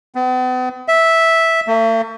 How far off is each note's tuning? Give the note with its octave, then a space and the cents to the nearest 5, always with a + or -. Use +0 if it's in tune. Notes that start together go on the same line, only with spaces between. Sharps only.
B3 +45
E5 -5
A3 +45